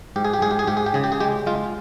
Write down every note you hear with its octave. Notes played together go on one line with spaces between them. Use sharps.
G#2 G4
G#4
G4
G#2 G#4
G4
G#4
G#2 G4
G#4
G4
C#3 G#4
G4
G#4
G#3 G4
G#3 F4